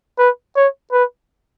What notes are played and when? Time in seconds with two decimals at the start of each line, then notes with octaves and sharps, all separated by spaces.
0.18 B4
0.56 C#5
0.92 B4